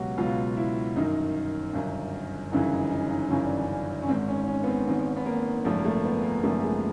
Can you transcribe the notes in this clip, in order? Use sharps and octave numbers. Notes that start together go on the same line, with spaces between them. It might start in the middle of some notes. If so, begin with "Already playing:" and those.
Already playing: C#2 B2 F#3 F#4 G4
C#2 B2 F#3 F4
E4
G1 F#2 D#3 D#4
G1 F#2 D#3
G1 F#2 C#3 E3 D#4
D#4
D#4
D#4
G1 F#2 C#3 E3 C#4
D4
C#4
C#4
G#1 G#2 D#3 C4
C#4
C#4
B3
C4
G#1 G#2 D#3 C4
B3
A#3
G#1 F#2 C#3 F3 A3
A#3
A3
B3
A#3
G#1 F#2 C#3 F3 A3
G#3